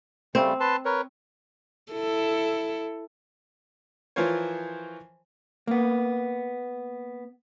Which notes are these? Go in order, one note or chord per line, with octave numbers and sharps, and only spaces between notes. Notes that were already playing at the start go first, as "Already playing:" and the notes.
C#3 G3 A3 C4
B4 A5 C6
A#4 B4 C#5
E4 A4
E3 F3 F4 A#4 C5 C#5
A#3 B3